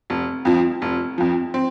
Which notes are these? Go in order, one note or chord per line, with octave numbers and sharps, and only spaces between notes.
F1
F2 F3
F1
F2 F3
C4